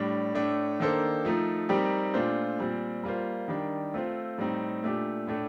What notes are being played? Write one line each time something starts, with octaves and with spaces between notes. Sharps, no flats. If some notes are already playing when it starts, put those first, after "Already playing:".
Already playing: A2 G3 D4
A2 A3 D4
D#3 A#3 D4 A4 C5
F3 A3 D#4
G3 C4 D#4 G4 A#4
A#2 A3 D4 F4 C5
A#2 G3 C4
G3 A#3 F4 C5
D#3 G3 D4
A3 C4 F4 A4 C5
A2 G3 C4 D#4
A#2 A3 D4 G4
A2 A3 D4 A4